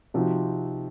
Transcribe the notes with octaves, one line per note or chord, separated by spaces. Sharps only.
C3 F3 C4 D#4 F#4